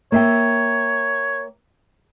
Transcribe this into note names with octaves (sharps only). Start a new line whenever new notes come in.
A#3 C#5 E5 G5